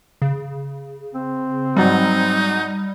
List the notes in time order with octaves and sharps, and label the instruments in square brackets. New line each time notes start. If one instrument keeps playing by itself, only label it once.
[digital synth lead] C#3
[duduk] C4
[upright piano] G#2 F#3 [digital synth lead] G3 [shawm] D#4